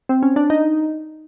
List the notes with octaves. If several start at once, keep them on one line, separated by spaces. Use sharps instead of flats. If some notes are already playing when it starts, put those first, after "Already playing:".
C4
C#4
D4
D#4